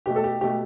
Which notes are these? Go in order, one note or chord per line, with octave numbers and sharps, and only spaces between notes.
B2 A3 G4
A4
G4
B2 A3 G4